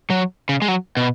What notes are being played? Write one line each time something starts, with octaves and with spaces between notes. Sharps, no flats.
F#3
C#3
G#3
F#3
B2